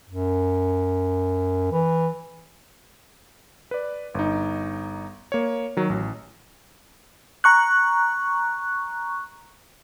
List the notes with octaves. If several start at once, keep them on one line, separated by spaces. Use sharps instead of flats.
F#2
E3
B4 D5
G1 D#4
A#3 C#5
D#3 F#3
A1
A#5 C#6 F#6